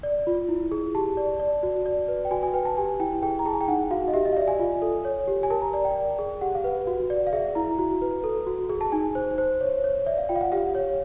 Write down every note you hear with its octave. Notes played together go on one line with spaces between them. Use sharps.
D5
F4
E4
G#4
G4 A5
D5
D5
F#4
D5
B4
G5
F#4 G#5
G#5
B4 G5
A5
G4 G#5
E4 G5
G#4 G5
A#5
G#4 A5
G#5
G5
D#4 F#5
F#4 F5
D#5
G4 E5
D#5
F5
D5 E5
G#5
F4
A4
C#5
G4
G#5
A#4 A5
A#5
D5
G5
D5
G#4
G4 F#5
F5
B4 F#5
F#4
D5
F5
G#4 E5
E4 A#5
F#4
B4
A4
F#4
G#4
A5
D#4 G#5
C5
C5
C#5
C#5
D5 E5
F5
F4 G5
F5
F#5
G4 F5
C#5